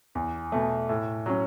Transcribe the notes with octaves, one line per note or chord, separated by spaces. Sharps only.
E2
B2 A3
A2
F#3 C#4